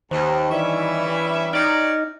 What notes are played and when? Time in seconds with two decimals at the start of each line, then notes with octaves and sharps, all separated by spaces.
0.11 D#2 D#3 G4 C5
0.50 G2 E3 G3 C#4 D5 E5 C#6
1.53 D#4 G4 C#5 D5 F6 A#6